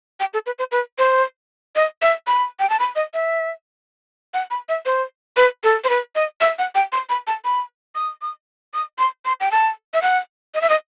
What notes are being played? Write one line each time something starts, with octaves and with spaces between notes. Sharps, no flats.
G5
A4
B4
C5
B4
C5
D#5
E5
B5
G5
A5
B5
D#5
E5
F#5
B5
E5
C5
B4
A4
C5
B4
D#5
E5
F#5
G5
C6
B5
A5
B5
D#6
D#6
D#6
C6
C6
G5
A5
E5
F#5
D#5
E5
D#5